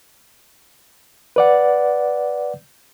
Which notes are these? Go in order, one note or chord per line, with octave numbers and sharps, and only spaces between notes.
B4 D5 F#5